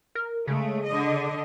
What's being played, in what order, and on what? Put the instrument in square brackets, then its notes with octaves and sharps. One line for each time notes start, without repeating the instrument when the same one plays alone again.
[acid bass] A#4
[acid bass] C#3 [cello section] G#3 A3
[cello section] D3 D#5